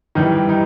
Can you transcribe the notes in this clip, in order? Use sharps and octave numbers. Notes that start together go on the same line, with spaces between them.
G2 D#3 E3 G3 D#4
D#4